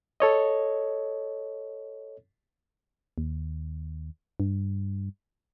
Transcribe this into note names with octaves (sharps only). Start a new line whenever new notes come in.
A4 C#5 D#5
D#2
G2